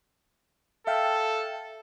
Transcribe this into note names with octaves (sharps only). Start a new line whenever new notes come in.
A4 E5 F5 G5